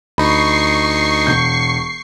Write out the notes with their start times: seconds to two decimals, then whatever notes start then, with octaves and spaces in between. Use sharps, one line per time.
0.18 D2 D#4 B5 C#6 C7
1.27 E1 G6